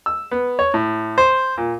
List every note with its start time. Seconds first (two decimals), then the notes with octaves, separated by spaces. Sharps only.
0.06 E6
0.32 B3
0.59 C#5
0.74 A2
1.18 C5
1.58 A#2